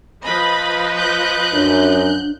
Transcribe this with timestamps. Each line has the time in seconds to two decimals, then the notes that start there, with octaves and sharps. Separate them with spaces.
0.24 F3 B4 D#5 B5
0.95 F#6 G6
1.53 F#2 D4